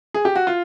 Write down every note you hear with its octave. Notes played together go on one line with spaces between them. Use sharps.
G#4
G4
F#4
F4